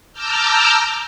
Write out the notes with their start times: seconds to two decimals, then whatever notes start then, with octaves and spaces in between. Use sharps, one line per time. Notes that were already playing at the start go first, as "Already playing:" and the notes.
0.13 A5 A#5 D6 E6 F6 G6